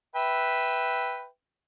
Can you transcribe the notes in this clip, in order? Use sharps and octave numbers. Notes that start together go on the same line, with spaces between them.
B4 E5 G5